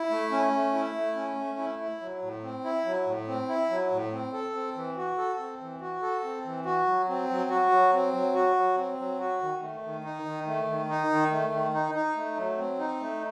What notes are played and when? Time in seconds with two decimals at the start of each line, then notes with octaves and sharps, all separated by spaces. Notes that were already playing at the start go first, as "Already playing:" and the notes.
Already playing: E4
0.10 A3
0.31 C#4
0.53 A3
0.74 E4
0.95 A3
1.15 C#4
1.37 A3
1.58 E4
1.79 E4
2.01 F#3
2.22 A2
2.43 C4
2.64 E4
2.85 F#3
3.06 A2
3.27 C4
3.49 E4
3.70 F#3
3.91 A2
4.12 C4
4.33 A4
4.54 C4
4.75 E3
4.97 F#4
5.18 A4
5.39 C4
5.61 E3
5.81 F#4
6.02 A4
6.24 C4
6.45 E3
6.65 F#4
6.87 F#3
7.09 C4
7.29 F#3
7.50 F#4
7.72 F#3
7.93 C4
8.14 F#3
8.35 F#4
8.56 F#3
8.77 C4
8.98 F#3
9.20 F#4
9.41 D#3
9.62 A3
9.83 D#3
10.04 D#4
10.25 D#3
10.46 A3
10.68 D#3
10.89 D#4
11.10 D#3
11.32 A3
11.52 D#3
11.74 D#4
11.95 D#4
12.16 A3
12.37 F#3
12.58 C4
12.79 D#4
13.00 A3